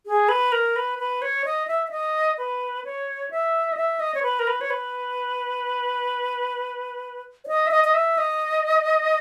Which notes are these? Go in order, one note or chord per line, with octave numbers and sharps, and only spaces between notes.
G#4
B4
A#4
B4
B4
C#5
D#5
E5
E5
D#5
B4
C#5
E5
D#5
E5
D#5
C#5
B4
A#4
B4
C#5
B4
C#5
D#5
E5
D#5
D#5
E5
D#5